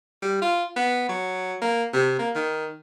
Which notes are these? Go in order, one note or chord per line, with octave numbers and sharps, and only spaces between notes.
G3
F4
B3
F#3
A#3
C3
A#3
D#3